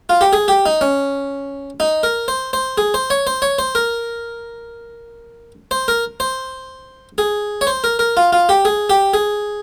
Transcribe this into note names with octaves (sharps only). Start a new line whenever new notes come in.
F4
G4
G#4
G4
D#4
C#4
D#4
A#4
C5
C5
G#4
C5
C#5
C5
C#5
C5
A#4
C5
A#4
C5
G#4
C#5
C5
A#4
A#4
F4
F4
G4
G#4
G4
G#4